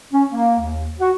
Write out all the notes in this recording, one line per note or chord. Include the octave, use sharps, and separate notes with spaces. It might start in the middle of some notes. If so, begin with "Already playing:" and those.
C#4
A#3
D#2
F#4